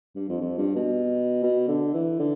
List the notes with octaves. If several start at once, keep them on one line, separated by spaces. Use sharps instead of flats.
G2
F2
F2
G2
B2
B2
D3
E3
D3